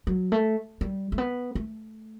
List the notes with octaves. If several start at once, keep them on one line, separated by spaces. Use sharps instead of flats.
F#3
A3
G3
A3
B3
A3